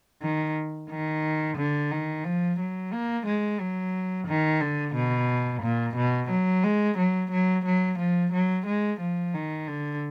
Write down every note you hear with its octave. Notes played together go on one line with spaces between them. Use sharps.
D#3
D#3
D3
D#3
F3
F#3
A#3
G#3
F#3
D#3
D3
B2
A#2
B2
F#3
G#3
F#3
F#3
F#3
F3
F#3
G#3
F3
D#3
D3